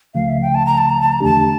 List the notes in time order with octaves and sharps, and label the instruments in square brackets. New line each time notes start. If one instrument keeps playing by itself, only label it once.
[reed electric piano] C#2 C#3 F3 A3 [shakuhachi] F5
[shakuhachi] E5
G5
A5
A#5
A5
A#5
A5
A#5
[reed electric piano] E2 D3 A3 D4 G4 [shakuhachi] A5